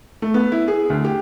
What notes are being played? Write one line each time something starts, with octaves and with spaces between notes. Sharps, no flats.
A3
B3
E4
G#4
D2
G4